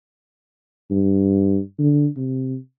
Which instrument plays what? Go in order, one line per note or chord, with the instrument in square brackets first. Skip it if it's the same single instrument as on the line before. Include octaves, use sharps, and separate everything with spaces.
[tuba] G2
D3
C3